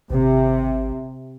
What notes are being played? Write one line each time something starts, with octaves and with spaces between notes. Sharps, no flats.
G#1 C3